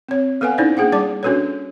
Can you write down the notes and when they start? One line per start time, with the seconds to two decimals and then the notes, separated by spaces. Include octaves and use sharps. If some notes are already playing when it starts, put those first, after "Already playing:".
0.09 C4 C#5
0.41 B3 A4 B4 F5 F#5 G#5
0.58 C#4 D#4 E4 A4 C5 D5
0.77 A#3 D4 G#4 F#5 G5
0.92 G3 D5 A5 D6
1.23 C#4 D4 F#4 A4 B4 C#5